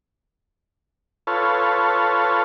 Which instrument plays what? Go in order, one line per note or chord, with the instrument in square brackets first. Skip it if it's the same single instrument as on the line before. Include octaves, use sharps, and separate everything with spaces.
[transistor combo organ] F4 A4 B4 C#5